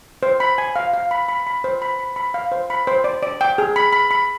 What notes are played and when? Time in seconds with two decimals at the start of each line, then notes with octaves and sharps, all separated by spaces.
0.23 C5
0.40 B5
0.58 G#5
0.76 F5
0.94 F5
1.11 B5
1.28 B5
1.47 B5
1.64 C5
1.82 B5
1.99 B5
2.16 B5
2.34 F5
2.52 C5
2.70 B5
2.87 C5
3.04 D5
3.23 D5
3.41 G5
3.58 G#4
3.76 B5
3.93 B5
4.11 B5